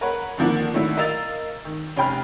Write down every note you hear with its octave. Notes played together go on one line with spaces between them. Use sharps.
A#4 B4 C#5 F#5
D3 D#3 F3 A#3 F#5
A2 D3 D#3 F#3 E4
A#4 D#5 F5 E6 A6 F7
D#3
F1 C#4 G5 B5 F6